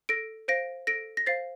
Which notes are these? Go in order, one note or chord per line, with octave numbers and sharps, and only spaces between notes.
A4 A#6 D7
C5 F5 A#6 D7
A4 A#6 D7
A#6
C5 F5 A6 C7